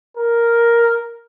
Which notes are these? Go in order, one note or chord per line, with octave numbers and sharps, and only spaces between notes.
A#4